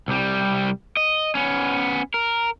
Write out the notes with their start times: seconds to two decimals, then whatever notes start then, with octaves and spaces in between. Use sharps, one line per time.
0.08 C2 G3
0.97 D#5
1.35 B3 C#4
2.14 A#4